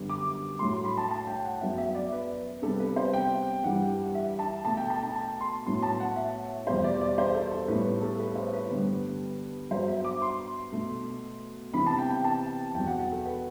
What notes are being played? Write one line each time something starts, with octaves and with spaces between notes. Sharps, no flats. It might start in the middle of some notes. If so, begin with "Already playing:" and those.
Already playing: F#2 D3 G3 B3
D6
A2 F#3 A3 C6
C6
B5
A5
A5
G5
F#5
F#2 F#3 B3 E5
E5
D5
B4
C3 G3 B3 A4
B4
C5
G5
G2 E3 G3 F#5
E5
A5
B2 A3 A5
G5
A5
A5
A5
C6
A2 F#3 B3 C6
A5
F#5
E5
E2 B2 G3 B3 C5
D5
D5
C5
A4
A4
A2 G3 B3 B4
B4
A4
B4
C5
B4
G2 D3 G3 B3
G2 F#3 B3 C5
E5
D6
C6
B2 A3
C3 E3 B3 B5
A5
G5
G5
A5
E2 B2 F#3 B3 G5
F#5
F#5
A4
B4